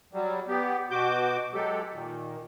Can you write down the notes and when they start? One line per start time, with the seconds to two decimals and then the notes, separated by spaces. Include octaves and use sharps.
0.13 F#3 G3
0.48 B3 G4
0.91 B2 F#4 D6 G6
1.54 F#3 G#3 G4 A4
1.92 A#2 D#3